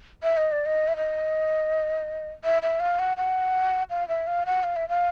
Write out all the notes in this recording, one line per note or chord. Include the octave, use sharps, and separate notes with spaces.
E5
D#5
D5
D#5
E5
D#5
E5
E5
F5
F#5
F#5
F5
E5
F5
F#5
F5
E5
F5